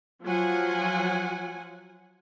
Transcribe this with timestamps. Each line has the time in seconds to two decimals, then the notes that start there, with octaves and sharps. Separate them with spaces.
0.24 F3 F#3 F4 F#5 G#5